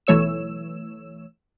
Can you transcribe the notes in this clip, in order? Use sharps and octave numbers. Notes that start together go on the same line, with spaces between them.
B1 E3 A3 C#5 E6 E7